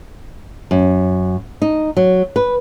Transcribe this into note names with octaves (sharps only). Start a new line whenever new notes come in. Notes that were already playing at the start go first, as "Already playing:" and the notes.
F#2
D#4
F#3
B4